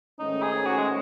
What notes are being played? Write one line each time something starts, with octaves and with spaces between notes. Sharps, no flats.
G#2 D#3 A3 C#4 D#4
G#4
F#4
G#3